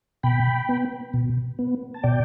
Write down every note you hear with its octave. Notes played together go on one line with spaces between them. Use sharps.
B2 G5 B5
B3
B2
B3
A5
B2 D5 G5